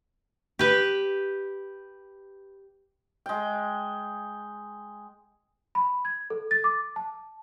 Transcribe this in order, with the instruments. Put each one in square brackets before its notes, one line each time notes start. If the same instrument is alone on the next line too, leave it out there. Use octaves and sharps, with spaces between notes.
[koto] G4 B4
[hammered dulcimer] G#3 G5
[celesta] B5
G#6
A4
A6
D6
A5